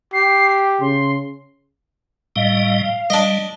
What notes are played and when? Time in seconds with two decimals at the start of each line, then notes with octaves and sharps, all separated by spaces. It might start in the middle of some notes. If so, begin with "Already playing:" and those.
0.13 G4 C7
0.81 C#3 C6
2.36 A2 G3 D#5 F5
3.10 G3 D4 D#5